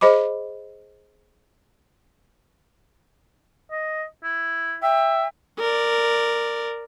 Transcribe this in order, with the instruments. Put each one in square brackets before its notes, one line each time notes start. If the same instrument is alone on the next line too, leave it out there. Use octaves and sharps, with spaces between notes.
[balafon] G#4 C5 D#5 B5 D6
[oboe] D#5
E4
[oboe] E5 [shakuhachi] G5
[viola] A#4 D5